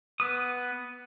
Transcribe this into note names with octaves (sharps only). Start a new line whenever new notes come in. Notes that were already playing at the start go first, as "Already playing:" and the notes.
B3 B4 D#6